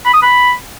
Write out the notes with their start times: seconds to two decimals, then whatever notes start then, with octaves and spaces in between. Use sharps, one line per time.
0.05 B5
0.14 D#6
0.22 B5